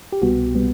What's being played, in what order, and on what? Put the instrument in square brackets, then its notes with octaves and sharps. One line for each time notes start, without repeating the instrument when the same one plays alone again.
[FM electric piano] G4
C2 B2 G3 B3 F#4
B2 G3 B3